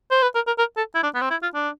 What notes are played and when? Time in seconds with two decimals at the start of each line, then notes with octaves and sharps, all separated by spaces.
0.11 C5
0.22 B4
0.35 A#4
0.47 A#4
0.58 A#4
0.77 A4
0.95 E4
1.03 D4
1.15 B3
1.21 C4
1.31 E4
1.43 F4
1.55 D4